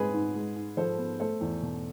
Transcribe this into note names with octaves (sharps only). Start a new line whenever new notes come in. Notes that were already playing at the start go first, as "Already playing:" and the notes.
Already playing: G#2 G#3 C4 G#4 B4
G#2
G#3
G#2
F3 A4 C5
B3
A3 A4 C5
E2
B2